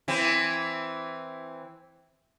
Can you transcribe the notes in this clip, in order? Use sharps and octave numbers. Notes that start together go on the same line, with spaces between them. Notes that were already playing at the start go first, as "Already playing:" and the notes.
E3 C4